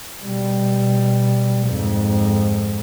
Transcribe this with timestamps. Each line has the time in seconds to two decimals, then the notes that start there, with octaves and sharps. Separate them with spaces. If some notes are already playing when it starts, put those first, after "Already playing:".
0.24 B2 G3
1.68 F2 G#2